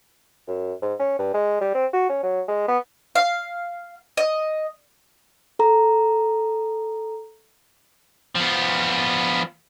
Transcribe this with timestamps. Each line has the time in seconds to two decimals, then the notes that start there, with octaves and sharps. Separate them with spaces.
0.47 F#2
0.82 G#2
0.99 C#4
1.19 G2
1.34 G#3
1.60 G3
1.74 C4
1.93 F#4
2.09 C#4
2.23 F#3
2.48 G#3
2.68 B3
3.15 F5
4.17 D#5
5.59 A4 A#5
8.35 F3 B3